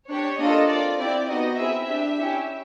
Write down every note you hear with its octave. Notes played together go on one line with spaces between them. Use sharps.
D4 G4 C#5
A#3 D4 F4 A4 D#5
C4 F4 A4 D5
C4 E4 G4 D5
B3 D#4 F#4 D#5
C4 E4 G#4 E5
D4 G4
C#4 E4 G4